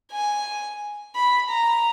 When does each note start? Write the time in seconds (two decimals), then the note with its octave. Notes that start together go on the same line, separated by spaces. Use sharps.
0.12 G#5
1.15 B5
1.50 A#5